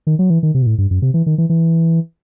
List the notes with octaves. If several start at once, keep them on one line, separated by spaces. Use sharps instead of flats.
D#3
F#3
E3
D#3
C3
B2
A2
G2
F#2
C3
E3
D#3
E3
E3